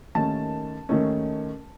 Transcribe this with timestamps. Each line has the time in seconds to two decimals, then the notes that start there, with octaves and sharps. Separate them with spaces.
0.15 D#2 D#3 A3 C#4 A5
0.89 D#2 D#3 A3 C#4